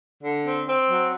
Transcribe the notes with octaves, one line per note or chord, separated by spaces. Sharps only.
D3
C4
C4
F#3